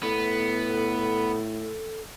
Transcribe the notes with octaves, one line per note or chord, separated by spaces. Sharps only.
A2 B3 A4